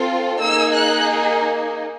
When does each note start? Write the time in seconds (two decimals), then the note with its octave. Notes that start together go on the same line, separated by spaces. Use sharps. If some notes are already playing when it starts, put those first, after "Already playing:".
Already playing: C4 F4 A4
0.39 A#3 D#4 G#4 E6
0.75 F#6